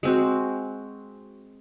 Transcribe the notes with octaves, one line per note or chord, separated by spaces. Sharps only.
G#3 C4 F#4